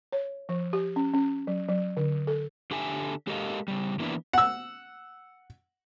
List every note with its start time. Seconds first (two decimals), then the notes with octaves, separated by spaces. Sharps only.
0.13 C#5
0.49 F3
0.73 G4
0.96 C#4
1.14 C#4
1.47 F#3
1.68 F#3
1.97 D3
2.27 A4
2.71 D3 G4 A4 E5 G#5
3.27 G#3 G4 A4 A#4 D#5 F5
3.68 C#3 G3
4.00 E3 A#3 B3 D4 E4
4.33 F#5 E6